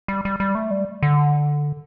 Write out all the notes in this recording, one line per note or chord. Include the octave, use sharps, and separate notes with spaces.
G3
G3
G3
A3
G3
D3